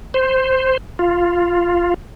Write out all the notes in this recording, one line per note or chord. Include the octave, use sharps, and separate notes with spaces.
C5
F4